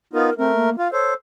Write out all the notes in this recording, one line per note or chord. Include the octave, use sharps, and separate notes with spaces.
B3 D#4 F4 A#4
A3 C4 A#4
A#3
F4 F5
A4 C5 C#5